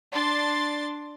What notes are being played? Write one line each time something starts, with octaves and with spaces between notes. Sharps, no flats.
D4 C6 A6